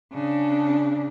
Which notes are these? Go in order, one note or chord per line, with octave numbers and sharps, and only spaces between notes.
C#3 D4